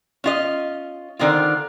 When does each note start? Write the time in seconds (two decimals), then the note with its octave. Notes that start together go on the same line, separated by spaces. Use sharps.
0.24 C#4 F4 D#5
1.19 D3 D#3 C4 F4